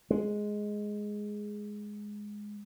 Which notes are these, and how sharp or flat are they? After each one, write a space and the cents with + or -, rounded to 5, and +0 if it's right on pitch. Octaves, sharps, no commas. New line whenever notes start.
G#3 +5